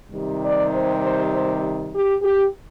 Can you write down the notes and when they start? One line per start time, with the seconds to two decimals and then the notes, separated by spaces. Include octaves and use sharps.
0.12 C3 D#3 G3
0.42 D5
0.72 C5
1.02 C5
1.32 C5
1.93 G4
2.22 G4